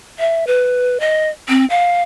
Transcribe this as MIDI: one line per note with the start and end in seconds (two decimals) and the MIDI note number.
0.19 0.45 76
0.47 0.98 71
1.00 1.30 75
1.49 1.65 60
1.70 2.02 77